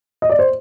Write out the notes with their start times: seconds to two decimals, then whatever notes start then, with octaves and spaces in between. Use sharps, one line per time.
0.22 D#5
0.30 D5
0.39 C5